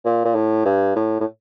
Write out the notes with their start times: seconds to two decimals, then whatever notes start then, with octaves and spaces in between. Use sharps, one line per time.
0.05 A#2
0.25 A#2
0.35 A2
0.65 G2
0.96 A2
1.20 A2